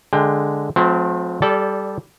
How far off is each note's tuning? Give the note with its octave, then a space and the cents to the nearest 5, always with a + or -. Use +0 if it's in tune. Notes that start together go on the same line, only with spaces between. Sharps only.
D3 +0 G#3 +0 G5 +25
F3 +40 A3 -40 C4 -25
G3 +0 A4 -15 D5 -25